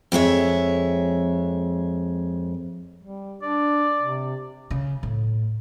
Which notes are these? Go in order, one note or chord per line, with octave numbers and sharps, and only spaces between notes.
F2 G#3 C#5 E5
G3
D4 D5
C3
C#3
A2